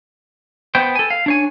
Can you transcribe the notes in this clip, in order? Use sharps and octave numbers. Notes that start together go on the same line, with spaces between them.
B3 C5 G5
A4 G#5
F5
D4 C#5 G#5